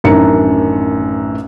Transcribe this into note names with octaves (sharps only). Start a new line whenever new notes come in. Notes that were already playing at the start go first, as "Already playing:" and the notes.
A1 F#2 D#3 D4 A#5 C#7